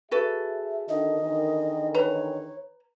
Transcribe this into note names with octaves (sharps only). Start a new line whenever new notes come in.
F#4 G#4 A4 B4 E5
D3 D#3 D#5
E2 D3 D#3
B4 C#5 A#5